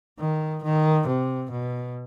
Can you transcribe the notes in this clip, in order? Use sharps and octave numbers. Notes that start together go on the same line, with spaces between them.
D#3
D#3
C3
B2